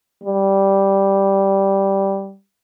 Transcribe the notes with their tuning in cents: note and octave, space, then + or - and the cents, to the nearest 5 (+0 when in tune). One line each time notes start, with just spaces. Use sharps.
G3 -5